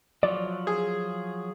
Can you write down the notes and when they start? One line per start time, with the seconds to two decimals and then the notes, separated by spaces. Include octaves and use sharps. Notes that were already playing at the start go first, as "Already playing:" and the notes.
0.23 F3 F#3 D5
0.67 G#4